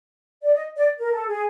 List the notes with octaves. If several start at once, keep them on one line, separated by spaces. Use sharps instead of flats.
D5
D#5
D5
A#4
A4
G#4